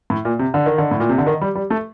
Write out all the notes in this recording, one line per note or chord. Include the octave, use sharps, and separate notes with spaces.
A2
A#2
C3
D3
D#3
D3
A2
A#2
C3
D3
D#3
G3
G3
A3